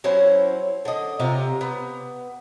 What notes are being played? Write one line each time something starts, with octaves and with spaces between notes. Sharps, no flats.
F#3 C#4 E4 C5
D3 D#5
C3 F4 A#5
B3